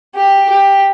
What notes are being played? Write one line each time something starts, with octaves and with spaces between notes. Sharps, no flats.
G4
G4